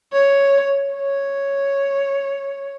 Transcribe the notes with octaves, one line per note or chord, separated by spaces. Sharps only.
C#5
C#5